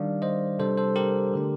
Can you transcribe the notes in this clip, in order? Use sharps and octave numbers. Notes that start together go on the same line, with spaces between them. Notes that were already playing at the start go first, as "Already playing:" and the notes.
Already playing: D#3 G3 D4 D5 F5
C5 D#5
C3 G3 D4 A4 C5
A4 C5
G4 A#4
D3 A3 D4